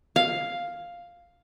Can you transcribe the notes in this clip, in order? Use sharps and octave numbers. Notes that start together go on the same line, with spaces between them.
F5